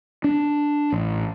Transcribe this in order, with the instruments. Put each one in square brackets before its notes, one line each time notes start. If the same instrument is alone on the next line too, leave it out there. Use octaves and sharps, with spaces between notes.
[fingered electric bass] D4
A1